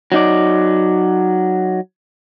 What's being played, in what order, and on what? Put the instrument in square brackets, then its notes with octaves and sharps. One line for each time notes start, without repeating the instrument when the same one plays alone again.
[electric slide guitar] F#3 D#4 D5